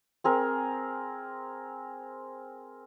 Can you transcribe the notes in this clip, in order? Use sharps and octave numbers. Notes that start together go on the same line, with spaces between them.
C4 G#4 A#4